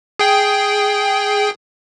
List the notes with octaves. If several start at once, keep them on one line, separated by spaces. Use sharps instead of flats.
G#4 G5